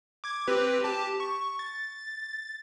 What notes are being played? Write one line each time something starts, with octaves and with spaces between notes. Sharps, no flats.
D6 G#6
C4 G4 B4
G4 A5
C#6
A6